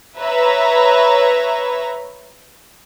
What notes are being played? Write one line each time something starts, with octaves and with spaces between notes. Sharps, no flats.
B4 C#5 E5 A#5